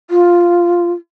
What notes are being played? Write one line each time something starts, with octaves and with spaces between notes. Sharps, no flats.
F4